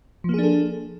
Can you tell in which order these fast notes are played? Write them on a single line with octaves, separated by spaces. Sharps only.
F3 A#3 G#4 D4 A4